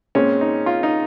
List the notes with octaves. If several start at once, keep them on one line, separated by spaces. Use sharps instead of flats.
A#2 G#3 C4 C#4
D#4
F4
D#4